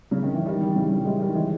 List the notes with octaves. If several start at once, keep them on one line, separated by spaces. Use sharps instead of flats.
C#3
D#3
E3
D#3 G3
D#3 G3
C#3 E3
D#3 G3
E3 G#3
D#3 G3
E3 G#3